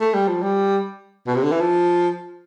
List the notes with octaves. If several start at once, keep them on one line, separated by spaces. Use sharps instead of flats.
A3
G3
F3
G3
B2
C3
D3
E3
F3